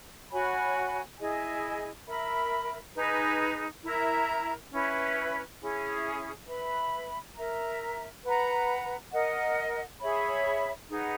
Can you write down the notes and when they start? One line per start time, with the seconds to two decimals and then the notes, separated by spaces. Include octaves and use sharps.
0.30 F#4 C#5 G#5 B5
1.19 E4 G#4 D#5 G#5
2.07 A#4 E5 B5
2.95 D#4 G#4 B4
3.83 E4 A#4 E5 A#5
4.72 C#4 E4 B4
5.60 C#4 E4 G#4
6.47 B4 E5 B5
7.36 A#4 E5 A#5
8.25 B4 F#5 A#5
9.13 A#4 D#5 F#5
10.00 G#4 C#5 E5 B5
10.89 D#4 G#4 B4 F#5